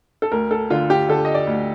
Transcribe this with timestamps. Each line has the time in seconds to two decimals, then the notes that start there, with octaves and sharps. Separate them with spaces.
0.22 A4
0.32 D2 A#4
0.51 A4
0.70 D3 F4
0.90 G4
1.09 D3 A4
1.25 D#5
1.35 D5
1.47 D2